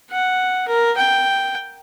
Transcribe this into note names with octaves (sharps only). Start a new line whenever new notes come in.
F#5
A#4
G5